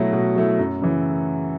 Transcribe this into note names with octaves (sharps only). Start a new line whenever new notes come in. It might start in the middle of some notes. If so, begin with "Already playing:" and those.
Already playing: B2 F#3 A3 E4
B2
F#3 A3 E4
F#2
C#3 E3